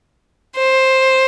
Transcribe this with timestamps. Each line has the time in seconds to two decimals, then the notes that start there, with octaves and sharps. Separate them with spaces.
0.57 C5